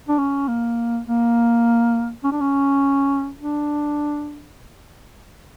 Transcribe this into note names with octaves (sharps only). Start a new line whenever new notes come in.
D4
C#4
A#3
A#3
C#4
D4
C#4
D4